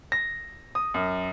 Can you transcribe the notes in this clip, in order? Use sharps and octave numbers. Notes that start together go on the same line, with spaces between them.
A#6
D#6
F#2